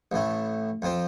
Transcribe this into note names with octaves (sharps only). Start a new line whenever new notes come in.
A1 A2 A3
F2 F3 C4